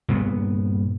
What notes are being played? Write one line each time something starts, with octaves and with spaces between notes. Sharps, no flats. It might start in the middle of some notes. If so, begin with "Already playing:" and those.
G2 A#2 B3